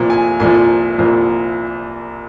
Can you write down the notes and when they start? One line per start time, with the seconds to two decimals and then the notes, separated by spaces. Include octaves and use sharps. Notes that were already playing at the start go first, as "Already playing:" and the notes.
Already playing: C2 A#2 F3 A#5
0.10 G#5
0.40 C2 A#2 F3 G#5
0.98 C2 A#2 F3